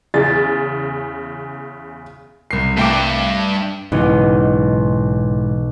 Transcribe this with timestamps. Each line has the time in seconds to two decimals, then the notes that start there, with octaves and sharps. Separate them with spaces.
0.14 E2 C#3 A6
2.51 C2 C7
2.77 G2 A3 G5 D6
3.92 B1 G#2 C#3 E3 B3 D#4